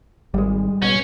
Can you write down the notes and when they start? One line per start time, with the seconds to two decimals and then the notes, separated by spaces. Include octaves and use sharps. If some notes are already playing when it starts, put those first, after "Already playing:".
0.34 G#1 G3 G#3
0.82 B2 C#4